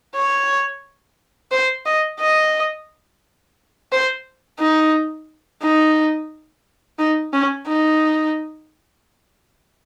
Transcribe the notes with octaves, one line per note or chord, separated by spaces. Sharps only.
C#5
C5
D#5
D#5
C5
D#4
D#4
D#4
C#4
D#4